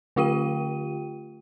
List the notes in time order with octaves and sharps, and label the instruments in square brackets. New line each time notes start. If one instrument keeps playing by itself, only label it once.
[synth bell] D3 A3 F4 G4 G5 D#7